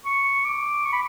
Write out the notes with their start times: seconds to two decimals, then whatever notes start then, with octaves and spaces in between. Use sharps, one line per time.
0.05 C#6
0.45 D6
0.85 C#6
0.93 B5